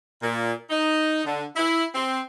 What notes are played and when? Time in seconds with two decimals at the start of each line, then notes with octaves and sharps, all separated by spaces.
0.21 A#2
0.70 D#4
1.25 D3
1.56 E4
1.95 C4